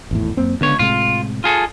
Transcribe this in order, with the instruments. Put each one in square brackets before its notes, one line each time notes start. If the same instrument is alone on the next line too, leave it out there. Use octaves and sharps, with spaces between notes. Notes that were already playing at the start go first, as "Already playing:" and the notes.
[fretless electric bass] G#1 E2 A2
F#2 A#3 C4
[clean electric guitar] C#2 C#5 [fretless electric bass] D3 B3
[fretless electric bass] A2 C3 G#3 [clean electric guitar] F4
[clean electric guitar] F4 G#4 A4